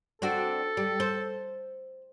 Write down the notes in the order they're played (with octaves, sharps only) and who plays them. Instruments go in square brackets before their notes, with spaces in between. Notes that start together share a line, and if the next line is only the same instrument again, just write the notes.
[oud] C4 D4 F#4 [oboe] A4
[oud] G3
C5